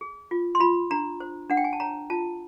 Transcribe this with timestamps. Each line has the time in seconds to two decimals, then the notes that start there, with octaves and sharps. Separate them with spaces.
0.01 G#4
0.31 F4
0.55 C6
0.60 F4 B5
0.91 D4 A#5
1.20 C5
1.50 D4 F#5
1.57 G5
1.64 G#5
1.73 A5
1.80 C#5 A#5
2.10 F4 A5